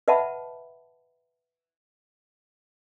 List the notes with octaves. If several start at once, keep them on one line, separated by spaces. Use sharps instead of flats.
B4 D#5 E5 F#5 A5 B5